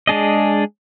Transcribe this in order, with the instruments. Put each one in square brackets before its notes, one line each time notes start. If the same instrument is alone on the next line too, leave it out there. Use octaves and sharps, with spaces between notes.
[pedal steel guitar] G#3 D4 G#4 D#5